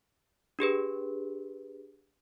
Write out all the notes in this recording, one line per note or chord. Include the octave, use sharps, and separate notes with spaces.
D4 G4 G#4 B4